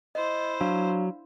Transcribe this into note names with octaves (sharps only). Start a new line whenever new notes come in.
E4 C5 D#5
F#3 D4 F5